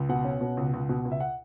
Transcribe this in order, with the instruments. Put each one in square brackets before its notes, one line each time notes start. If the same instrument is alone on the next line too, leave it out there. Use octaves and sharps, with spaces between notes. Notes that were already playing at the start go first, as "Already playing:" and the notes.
Already playing: [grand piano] C#2
B2 F#5
C#4
B2
C#2
C#2
B2
C#2
E5
F#5